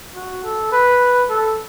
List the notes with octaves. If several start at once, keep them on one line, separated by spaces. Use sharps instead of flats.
F#4
A4
B4
A4